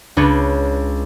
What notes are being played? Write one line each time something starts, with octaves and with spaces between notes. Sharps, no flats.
C#2 D4 B4 C#5 B5